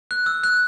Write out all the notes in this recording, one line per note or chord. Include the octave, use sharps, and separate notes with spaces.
F#6
E6
F#6